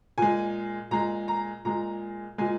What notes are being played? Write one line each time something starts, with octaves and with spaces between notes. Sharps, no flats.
A#2 G#3 G#5
A#2 G#3 A#5
A#5
A#2 G#3 A#5
A#2 G#3 G#5